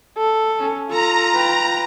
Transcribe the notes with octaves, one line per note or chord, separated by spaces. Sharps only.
A4
C#4
F4 A4 A#5
B4 G5